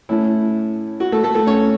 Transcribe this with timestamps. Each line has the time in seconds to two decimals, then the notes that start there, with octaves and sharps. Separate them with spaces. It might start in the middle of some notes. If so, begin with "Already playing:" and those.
0.09 A2 A3 C#4 E4
1.00 F#4
1.12 A3 A4
1.23 A3 A4
1.35 A3 A4
1.47 C#4 C#5